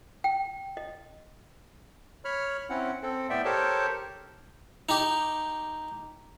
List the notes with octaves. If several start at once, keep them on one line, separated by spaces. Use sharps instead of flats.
G5
D#5
C#5 B5 F6
C4 C#4 E4 F#5
C4 A4
A2 B3 D5 E5 G5
G4 A4 A#4 C5 C#5 A5
D#4 G4